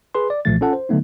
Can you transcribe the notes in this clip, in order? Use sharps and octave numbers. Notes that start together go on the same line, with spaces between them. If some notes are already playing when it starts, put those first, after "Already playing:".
G#4 B4 C6
D5
B1 A#2 E3 F3 A3 A6
C#4 F4 A4 F#5 A5
C5
D3 F#3 A3 B3 D#4